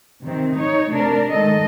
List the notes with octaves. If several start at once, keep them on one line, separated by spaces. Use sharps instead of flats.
C3 D#3 C4
D#4 C#5
C3 A3 D4 A#4
D#3 G#3 A3 A4 D#5